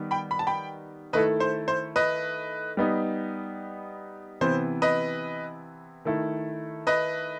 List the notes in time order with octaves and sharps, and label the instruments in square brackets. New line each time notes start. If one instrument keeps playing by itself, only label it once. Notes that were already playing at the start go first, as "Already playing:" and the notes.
Already playing: [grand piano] D#3 G3 B3 D#4
[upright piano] G5 B5
B5
A5
G5 B5
[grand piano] D#3 A3 E4 A4 [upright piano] B4 D#5
[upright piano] C5
C5
B4 D#5
[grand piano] G3 B3 D#4
[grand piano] C3 E3 B3 [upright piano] C5
[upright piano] B4 D#5
[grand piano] D#3 A3 E4 A4
[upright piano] B4 D#5